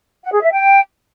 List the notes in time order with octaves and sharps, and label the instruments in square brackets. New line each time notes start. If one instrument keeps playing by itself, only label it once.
[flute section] F#5
G#4
E5
G5